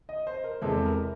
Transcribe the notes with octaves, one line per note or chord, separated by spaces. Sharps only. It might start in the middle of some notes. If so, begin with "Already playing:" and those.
D#5
C5
A#4
E2 C3 E3 G#3 A4
A#4